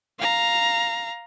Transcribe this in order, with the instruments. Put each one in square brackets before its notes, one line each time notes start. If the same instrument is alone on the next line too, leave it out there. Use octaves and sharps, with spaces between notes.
[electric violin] F5 A#5